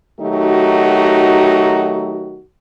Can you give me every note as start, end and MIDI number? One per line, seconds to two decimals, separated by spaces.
0.20 2.41 51
0.20 2.41 54
0.20 2.41 57
0.20 2.41 63
0.20 2.41 66
0.20 2.41 67